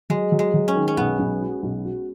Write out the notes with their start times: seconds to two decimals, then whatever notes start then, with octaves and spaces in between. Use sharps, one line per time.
0.10 F#3 G#3
0.32 F#3
0.39 G#3
0.54 F#3
0.68 C#4
0.75 D#3
0.88 C#4
0.97 B1 B3
1.19 B1
1.41 F#4
1.63 B1
1.84 F#4